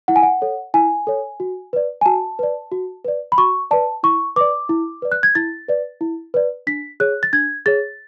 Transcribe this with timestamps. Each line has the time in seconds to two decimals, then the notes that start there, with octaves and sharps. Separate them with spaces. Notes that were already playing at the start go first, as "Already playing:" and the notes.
0.08 E4 F#5
0.16 G#5
0.23 F#5
0.42 A4 C#5
0.74 E4 G#5
1.07 A4 C#5
1.40 F#4
1.73 B4 D5
2.01 G#5
2.06 F#4 A5
2.39 B4 D5
2.72 F#4
3.05 B4 D5
3.32 B5
3.38 F#4 C#6
3.71 B4 D5 A5
4.03 E4 C#6
4.36 B4 D5 D6
4.69 E4
5.02 B4 D5
5.12 F#6
5.23 G#6
5.35 E4 A6
5.68 B4 D5
6.01 E4
6.34 B4 D5
6.67 D4 B6
7.00 G#4 C#5 F#6
7.23 A6
7.33 D4 G#6
7.66 G#4 C#5 A6